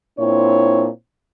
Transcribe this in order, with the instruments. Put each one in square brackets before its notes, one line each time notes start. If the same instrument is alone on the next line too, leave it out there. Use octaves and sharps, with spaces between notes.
[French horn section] A#2 C4 D4 E4 C#5